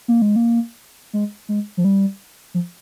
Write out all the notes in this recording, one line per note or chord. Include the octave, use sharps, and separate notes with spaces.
A#3
G#3
A#3
G#3
G#3
F3
G3
F3